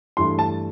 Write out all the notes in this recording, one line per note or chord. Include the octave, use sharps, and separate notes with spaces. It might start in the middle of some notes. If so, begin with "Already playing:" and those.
G2 E3 A3 C6
A5